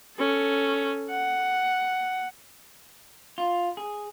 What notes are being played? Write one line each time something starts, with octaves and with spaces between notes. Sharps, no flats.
C#4 A4
F#5
F4
G#4